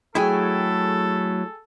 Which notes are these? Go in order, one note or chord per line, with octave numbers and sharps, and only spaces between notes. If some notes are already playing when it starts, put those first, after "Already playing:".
F#3 A3 E4 G#4 A4 G5 G#5